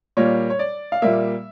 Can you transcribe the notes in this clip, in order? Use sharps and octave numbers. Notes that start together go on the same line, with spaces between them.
A#2 G3 A#3 C#5
C#5
D5
F5
A#2 G3 A#3 E5